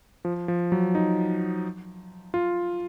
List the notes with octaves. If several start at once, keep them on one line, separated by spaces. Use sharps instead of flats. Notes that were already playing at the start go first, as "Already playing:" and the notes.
F3
F3
F#3
D#4
F4